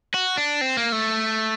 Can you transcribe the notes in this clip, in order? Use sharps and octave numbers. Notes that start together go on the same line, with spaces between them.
F#4
D4
C4
A#3
A3